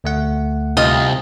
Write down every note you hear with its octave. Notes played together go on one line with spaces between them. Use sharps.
D2 A3 F#5
C2 F4 D#5